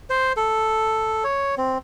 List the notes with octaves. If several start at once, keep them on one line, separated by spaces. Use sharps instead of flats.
C5
A4
C#5
C4